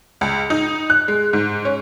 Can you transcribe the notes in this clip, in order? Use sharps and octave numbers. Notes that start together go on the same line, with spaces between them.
C#2
D#4
F#6
G#3
G#2
C#4